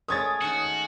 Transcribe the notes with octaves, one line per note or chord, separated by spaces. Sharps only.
G#3 A3 C#4 A#4 C#5 D#6 G#6 A6
D#3 C#4 F#4